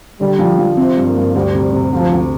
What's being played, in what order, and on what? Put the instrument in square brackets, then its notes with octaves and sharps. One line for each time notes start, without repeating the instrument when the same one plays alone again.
[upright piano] D3 [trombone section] G3
[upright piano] F3
F3
[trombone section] C3 [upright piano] C4
[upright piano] G2
[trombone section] A#3
[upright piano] G2
[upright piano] D2 [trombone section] G3
[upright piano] C3
C3
[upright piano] D2 [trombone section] F3
[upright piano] D2